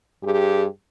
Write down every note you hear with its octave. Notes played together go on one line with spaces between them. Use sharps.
G2 G4 G#4